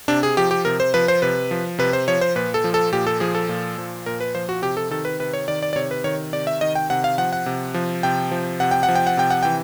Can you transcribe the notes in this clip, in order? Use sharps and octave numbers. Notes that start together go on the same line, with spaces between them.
C3 D4
G#4
F3 G4
G4
C3 A#4
C5
F3 B4
C5
C3 B4
F3
C3 B4
C5
F3 C#5
C5
A#2 B4
A4
F3
A4
A#2 G4
A4
F3 G#4
A4
A#2
F3
A#2 A#4
B4
F3 C5
F#4
C3 G4
A4
D#3 A4
B4
C3 B4
C#5
D#3 D5
D5
D5
C3 C#5
B4
D#3 C#5
C3 D5
E5
D#3 D#5
G5
C3 F#5
F5
F3 F#5
F#5
C3
F3
C3 G5
F3
C3 F#5
G5
F#5
F3
G5
F#5
C3 G5
F#5
E3 G5